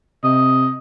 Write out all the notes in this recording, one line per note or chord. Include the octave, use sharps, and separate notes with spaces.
C3 D#5